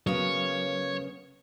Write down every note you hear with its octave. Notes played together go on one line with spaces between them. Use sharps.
C#3 F#3 A#3 B3 C#5